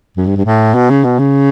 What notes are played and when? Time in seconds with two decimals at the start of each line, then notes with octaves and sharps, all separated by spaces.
0.17 F#2
0.26 G2
0.36 G2
0.45 A2
0.74 B2
0.90 C#3
1.04 B2
1.19 C#3